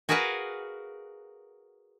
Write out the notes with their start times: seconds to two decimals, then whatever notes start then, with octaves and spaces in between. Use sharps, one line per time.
0.09 F#4 G#4 A#4 B4 F5 F#5